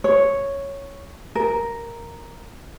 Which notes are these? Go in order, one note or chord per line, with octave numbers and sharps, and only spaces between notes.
C#5
A#4